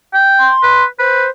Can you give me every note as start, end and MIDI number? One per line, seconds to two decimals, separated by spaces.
0.14 0.52 79
0.39 0.84 84
0.63 0.85 71
0.99 1.26 71
0.99 1.30 72